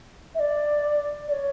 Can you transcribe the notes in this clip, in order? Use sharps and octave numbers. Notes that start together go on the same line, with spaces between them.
E5
D5
D5
C#5